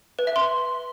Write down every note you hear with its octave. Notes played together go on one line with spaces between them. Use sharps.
B4
E5
C6